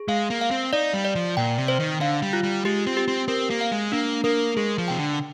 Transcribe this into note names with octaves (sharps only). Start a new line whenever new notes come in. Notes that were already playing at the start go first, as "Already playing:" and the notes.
Already playing: G#4
G#3 F5
A#3
F5
C4
D#4 D5
G3
D5
F3
A#2 G5
C3
C5
D#3
D3 F5
G3
F4
G3
G#3 G4
C4
G4
C4
C4 A#4
A#3
F5
G#3
A#3 D4
A#3 A#4
G#3 G#4
F3
C3 G5
D3